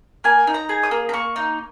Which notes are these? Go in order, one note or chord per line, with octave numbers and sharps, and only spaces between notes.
A#3 G#5
D#4
A#5
G#4
D#6
A#3
A#5
A#3 C#6
D#4